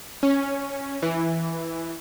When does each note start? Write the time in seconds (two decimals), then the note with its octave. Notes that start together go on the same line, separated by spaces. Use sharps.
0.23 C#4
1.02 E3